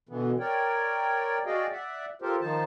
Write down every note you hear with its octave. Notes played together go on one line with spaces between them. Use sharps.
B2 D3 E3 B3
A#4 C#5 D5 G5
F#4 G#4 D5 D#5 F5 G5
D5 E5 F#5
F4 G4 A4 A#4 C5
D#3 F3 D#4 C5 A5